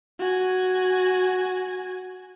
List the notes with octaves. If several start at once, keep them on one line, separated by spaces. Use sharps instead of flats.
F#4 G#5